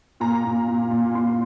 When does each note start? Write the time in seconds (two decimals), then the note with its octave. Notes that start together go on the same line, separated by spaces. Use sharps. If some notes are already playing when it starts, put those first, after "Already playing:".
0.20 A#2 A#5
0.45 A#2
0.68 A#2
0.91 A#2
1.15 A#2 C6